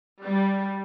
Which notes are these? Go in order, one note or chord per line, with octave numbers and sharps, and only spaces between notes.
G3